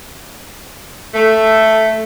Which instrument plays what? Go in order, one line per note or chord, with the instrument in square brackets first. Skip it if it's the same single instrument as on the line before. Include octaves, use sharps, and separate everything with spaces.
[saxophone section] A3